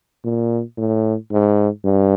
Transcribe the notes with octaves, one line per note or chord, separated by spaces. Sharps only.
A#2
A2
G#2
G2